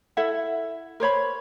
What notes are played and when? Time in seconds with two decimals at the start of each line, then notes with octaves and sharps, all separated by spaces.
0.17 E4 A4 E5 F#5
1.00 A#4 C5 C#5 B5